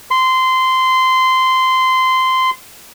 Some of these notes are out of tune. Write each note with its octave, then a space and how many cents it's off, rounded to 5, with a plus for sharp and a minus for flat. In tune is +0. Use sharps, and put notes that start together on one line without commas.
C6 -15